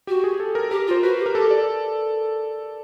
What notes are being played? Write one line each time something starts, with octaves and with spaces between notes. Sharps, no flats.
F#4 G4
G#4
A4
A#4
G4 A#4
F4
C5
F#4 B4
G4
A#4
G4 A4
D5